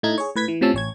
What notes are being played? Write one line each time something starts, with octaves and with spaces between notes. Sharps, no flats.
A2 A3 D#4 G#6
G#4 C#5
A2 B4 G#6 B6
E3
A2 C3 F3 C#4 A5 E6
A1 C#5 G#6